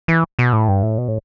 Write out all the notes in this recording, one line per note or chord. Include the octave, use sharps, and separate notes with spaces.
E3
B2
A2
G2
A2
B2
A2